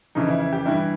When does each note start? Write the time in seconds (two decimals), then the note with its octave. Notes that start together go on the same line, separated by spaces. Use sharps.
0.15 F2 C#3 E3 D#4
0.28 E4
0.40 E4
0.53 G4
0.65 G2 E3 E4